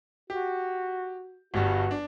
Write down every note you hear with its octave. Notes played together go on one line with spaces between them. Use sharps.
F#4 G4
G1 G2 G3 F#4
D4